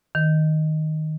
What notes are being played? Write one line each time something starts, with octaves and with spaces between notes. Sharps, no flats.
D#3